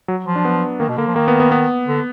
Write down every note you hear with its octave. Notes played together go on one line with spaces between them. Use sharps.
F#3
F3
D4
B3
D#3 A#3
B2
D3 A#3
F3
D#3 A#3
B3
B3
B3
D3